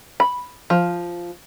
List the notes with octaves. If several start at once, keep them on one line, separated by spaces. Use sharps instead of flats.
B5
F3